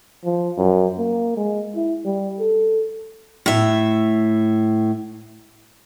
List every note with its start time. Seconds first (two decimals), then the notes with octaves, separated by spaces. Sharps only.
0.25 F3
0.58 F#2
0.99 A#3
1.37 G#3
1.76 E4
2.05 G3
2.40 A4
3.46 A2 E5